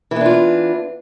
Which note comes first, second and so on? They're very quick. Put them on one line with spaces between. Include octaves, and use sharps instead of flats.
E3 B3 D4 F4